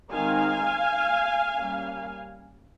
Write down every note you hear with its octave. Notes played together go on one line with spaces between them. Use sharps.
D#3 G#3 C4 D#4 F5 G#5
G3 A#3 C#4